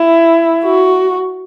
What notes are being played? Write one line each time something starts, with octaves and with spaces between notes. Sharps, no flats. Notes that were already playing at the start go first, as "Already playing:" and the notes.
Already playing: E4
F#4